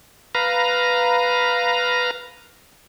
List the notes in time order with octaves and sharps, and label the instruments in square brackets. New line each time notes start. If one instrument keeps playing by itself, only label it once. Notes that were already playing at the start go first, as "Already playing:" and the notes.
[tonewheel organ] B4 F5 A#5